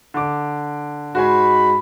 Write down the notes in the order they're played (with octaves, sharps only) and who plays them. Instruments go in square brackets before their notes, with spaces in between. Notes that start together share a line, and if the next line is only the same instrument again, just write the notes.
[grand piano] D3 D6
[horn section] G#2 G#3 B5 [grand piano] F#4 C5 G#5